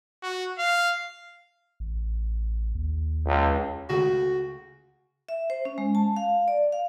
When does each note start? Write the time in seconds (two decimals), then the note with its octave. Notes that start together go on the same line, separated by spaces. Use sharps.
0.22 F#4
0.58 F5
1.80 A1
2.75 D#2
3.26 C#2
3.90 C#2 C#3 A3 F#4
5.29 E5
5.50 C5
5.65 C#4
5.78 G#3
5.95 A5
6.16 F5
6.48 D5
6.72 F5